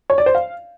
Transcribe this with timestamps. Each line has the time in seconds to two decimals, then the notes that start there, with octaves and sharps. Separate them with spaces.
0.10 C#5
0.18 D5
0.26 C5
0.35 F5